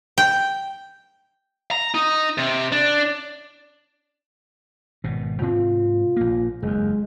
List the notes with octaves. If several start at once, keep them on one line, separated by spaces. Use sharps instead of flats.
G5
A#5
D#4
C3
D4
G#1 B2
G#2 C3 C4 F4
A#1 A#3
F#1 D#2 G#3